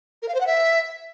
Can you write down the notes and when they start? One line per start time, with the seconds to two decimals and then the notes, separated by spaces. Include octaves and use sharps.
0.22 A#4
0.28 F5
0.34 C5
0.41 F#5
0.47 E5